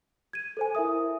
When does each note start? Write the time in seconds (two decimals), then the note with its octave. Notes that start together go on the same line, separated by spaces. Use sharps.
0.33 G#6 D#7
0.57 A4 C5 G#5
0.75 E4 A#4 E5 D#6